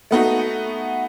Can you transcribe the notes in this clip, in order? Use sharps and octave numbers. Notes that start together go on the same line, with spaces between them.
A3 B3 D#4 F#4